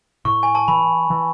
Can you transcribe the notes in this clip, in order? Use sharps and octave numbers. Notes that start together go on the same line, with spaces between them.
A2 C#6
G#5
A5
E3 B5
E3